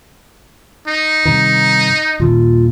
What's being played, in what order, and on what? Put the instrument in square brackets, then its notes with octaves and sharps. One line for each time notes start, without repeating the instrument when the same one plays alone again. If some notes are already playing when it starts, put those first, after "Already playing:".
[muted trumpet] D#4
[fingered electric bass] G2 C3 D#3 [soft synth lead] A#5
[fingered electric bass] D#1 D#2 A#2 [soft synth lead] F4